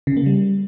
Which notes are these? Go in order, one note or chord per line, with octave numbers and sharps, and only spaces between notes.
C#3
A#3
G3